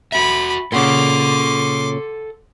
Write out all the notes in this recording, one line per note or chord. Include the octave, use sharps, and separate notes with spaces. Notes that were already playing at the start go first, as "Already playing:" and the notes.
F#4 E5 B5
A#2 C#3 A4 F#5 C6 D6